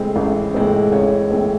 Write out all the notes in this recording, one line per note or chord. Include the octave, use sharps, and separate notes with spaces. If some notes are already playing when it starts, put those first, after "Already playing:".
Already playing: A2 G#3 C4
A1
A2 G#3 C4
A1 C#5
A2 G#3 C4